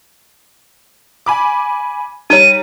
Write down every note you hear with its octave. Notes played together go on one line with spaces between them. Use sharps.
G#5 B5 D6
G3 D#4 C#5 A#5 D#7